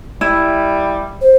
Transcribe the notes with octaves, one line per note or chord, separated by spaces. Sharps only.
G3 E4
C5